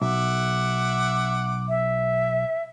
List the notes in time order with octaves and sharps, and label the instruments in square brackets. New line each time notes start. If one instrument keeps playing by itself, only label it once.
[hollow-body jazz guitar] B1 [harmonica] E5 F#5 D6
[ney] E5